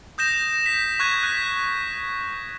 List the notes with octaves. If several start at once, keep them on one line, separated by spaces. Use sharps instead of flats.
D#6 G6 A#6 E7
B6
C#6 F#6 G#6
F#6 B6